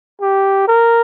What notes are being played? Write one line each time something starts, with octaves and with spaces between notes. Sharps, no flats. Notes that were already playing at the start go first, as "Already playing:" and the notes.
G4
A#4